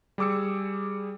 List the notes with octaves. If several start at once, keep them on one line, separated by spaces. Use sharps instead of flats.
G3 G#4 D6 E6 C#7